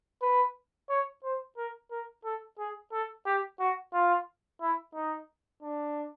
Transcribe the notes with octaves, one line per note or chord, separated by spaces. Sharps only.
B4
C#5
C5
A#4
A#4
A4
G#4
A4
G4
F#4
F4
E4
D#4
D4